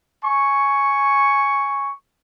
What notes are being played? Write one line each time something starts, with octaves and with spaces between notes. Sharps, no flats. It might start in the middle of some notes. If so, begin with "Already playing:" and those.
G#5 C#6